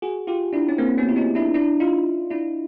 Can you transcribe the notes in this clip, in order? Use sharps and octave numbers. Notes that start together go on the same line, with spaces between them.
F#4 G#4
F4 G4
D4 E4
C#4
A#3 C4
B3 C#4
E4
C#4 D#4
D4 E4
D4 E4
D#4 F4
D4 E4